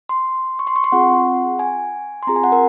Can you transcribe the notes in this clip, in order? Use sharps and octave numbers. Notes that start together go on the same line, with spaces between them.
C6
C#6
C6
C#6
C6
C4 F4 G#4 F#5
G#5
C6
C4 F4 G#4 A#5
G#5
F#5
A#4